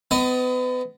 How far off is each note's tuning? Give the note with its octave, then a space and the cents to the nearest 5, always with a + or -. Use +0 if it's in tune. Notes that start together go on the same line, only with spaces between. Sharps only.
B3 +35 D#5 +0